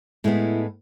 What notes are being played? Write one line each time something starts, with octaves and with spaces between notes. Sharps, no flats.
A2 G#3 B3 E4